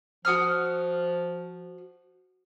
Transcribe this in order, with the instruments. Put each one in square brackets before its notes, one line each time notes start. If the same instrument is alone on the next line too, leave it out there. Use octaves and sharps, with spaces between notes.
[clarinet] F3 [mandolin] F#4 D#6 F6